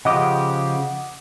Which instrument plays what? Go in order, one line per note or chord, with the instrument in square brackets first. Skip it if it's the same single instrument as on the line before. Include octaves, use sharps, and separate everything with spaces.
[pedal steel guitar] C#3 F3 G4 [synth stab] D#5 [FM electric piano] F#5 D6